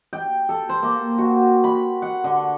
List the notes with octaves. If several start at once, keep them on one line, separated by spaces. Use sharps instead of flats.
G5
A4
C5
A#3
F#4
B5
F#5
D3